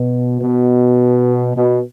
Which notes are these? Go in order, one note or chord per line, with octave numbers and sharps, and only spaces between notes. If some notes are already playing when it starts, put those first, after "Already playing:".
Already playing: B2
B2
B2